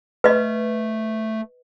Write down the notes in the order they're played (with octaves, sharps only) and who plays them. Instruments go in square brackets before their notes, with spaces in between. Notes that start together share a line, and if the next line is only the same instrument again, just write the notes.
[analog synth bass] A3 [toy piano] B4 D#5